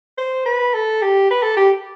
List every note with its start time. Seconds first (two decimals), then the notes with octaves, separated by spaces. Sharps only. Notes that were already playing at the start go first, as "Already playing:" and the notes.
0.18 C5
0.46 B4
0.74 A4
1.02 G4
1.31 B4
1.43 A4
1.57 G4